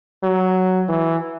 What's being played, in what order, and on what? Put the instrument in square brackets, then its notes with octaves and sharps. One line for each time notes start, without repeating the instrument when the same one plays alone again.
[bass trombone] F#3
E3